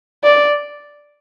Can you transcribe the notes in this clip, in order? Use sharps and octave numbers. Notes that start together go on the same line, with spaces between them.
D5